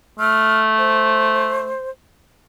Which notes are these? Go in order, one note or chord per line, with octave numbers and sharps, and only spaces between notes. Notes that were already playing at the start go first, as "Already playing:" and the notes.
A3 F6
C5